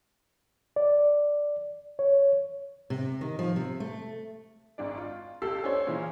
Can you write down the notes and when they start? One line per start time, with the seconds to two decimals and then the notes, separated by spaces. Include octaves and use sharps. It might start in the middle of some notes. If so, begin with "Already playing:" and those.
0.76 D5
1.99 C#5
2.90 C3
3.21 D#3
3.39 F3
3.56 C3
3.80 A3
4.78 G#1 G#2 D4 D5
4.98 F4
5.42 C#2 G4 A4 E6 C7
5.64 C#4 D4 C5 C#5
5.87 A#2 C#3 E3 E4